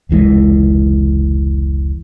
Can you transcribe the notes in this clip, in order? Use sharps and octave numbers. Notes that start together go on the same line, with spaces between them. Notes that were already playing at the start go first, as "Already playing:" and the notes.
F1 C#2 E3 G#3